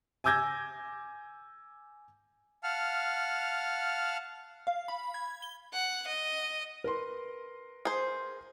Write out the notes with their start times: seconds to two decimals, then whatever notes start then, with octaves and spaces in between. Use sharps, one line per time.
0.24 G#5 D6 E6 G6 G#6 A#6
2.63 F5 F#5 A5 F6
4.67 F5
4.88 B5
5.14 G#6
5.42 G7
5.73 F#5
6.07 D#5
6.84 A#4 B4 C6
7.85 G#4 C5